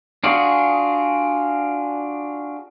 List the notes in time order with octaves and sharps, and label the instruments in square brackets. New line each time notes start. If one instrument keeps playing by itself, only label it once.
[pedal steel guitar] D4 F4 F#4 G#4